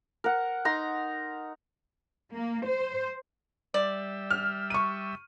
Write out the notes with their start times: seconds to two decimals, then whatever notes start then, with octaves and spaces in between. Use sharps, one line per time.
0.24 A#4 F#5
0.65 D#4 A#5 C6
2.34 A#3
2.67 C5
3.74 G3 D5 E5
4.31 F6
4.70 C#6 D#7